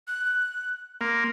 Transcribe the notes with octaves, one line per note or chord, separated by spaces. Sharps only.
F#6
A#3 C6